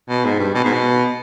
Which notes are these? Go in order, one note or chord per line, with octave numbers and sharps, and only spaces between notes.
B2
G#2
G2
B2
G#2
B2